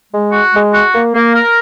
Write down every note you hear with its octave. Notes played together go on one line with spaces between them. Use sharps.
G#3
F#4
G#3
F#4
A#3
A#3
A#4